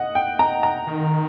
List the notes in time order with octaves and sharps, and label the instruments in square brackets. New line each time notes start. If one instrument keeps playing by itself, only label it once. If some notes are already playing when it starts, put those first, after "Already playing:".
Already playing: [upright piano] D#5 F#5
G5
A#5
A#5
[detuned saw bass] D#3